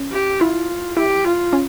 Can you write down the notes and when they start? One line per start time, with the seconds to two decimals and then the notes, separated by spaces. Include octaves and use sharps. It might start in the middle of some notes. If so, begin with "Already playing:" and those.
Already playing: C#4
0.12 G4
0.40 E4 F4
0.97 E4 G4
1.24 F4
1.53 C#4